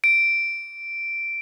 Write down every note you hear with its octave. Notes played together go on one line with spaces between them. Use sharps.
D7